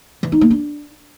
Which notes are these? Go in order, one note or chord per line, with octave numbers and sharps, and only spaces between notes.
E3
D#4
A#3
D4